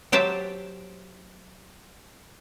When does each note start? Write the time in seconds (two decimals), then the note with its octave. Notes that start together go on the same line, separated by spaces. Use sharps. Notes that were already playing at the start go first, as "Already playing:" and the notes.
0.12 F#3 G4 C5 E5 A5